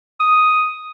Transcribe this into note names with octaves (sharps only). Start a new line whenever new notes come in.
D#6